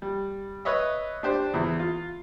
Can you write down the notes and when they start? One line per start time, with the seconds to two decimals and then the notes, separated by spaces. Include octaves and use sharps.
0.02 G3
0.65 B4 C#5 D#5 E5
1.23 D4 G4 C5
1.54 E2 E4
1.80 F4